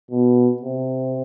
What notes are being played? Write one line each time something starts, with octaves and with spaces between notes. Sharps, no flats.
B2
C3